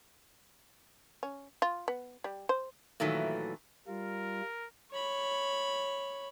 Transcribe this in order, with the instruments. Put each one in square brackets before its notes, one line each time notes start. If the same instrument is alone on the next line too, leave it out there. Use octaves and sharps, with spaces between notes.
[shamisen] C#4
F4
B3
G3
C5
[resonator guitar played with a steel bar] A#2 D#3 E3 F#3 A3
[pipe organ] G3 F4 [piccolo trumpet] A#4
[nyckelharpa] C#5 B5